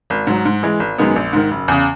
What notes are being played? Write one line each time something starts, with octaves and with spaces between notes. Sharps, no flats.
G#1
G#2 F#3
G#2
E3 G#3
G#1
F#2 D#3 G#3 B3
A#1
G#2 D#3
F#1
E2 C#3